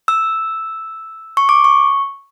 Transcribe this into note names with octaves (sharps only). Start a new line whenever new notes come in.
E6
C#6
D6
C#6